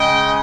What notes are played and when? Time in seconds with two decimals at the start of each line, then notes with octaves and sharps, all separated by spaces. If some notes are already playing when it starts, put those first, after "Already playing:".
Already playing: C#3 G#3 D#5 G5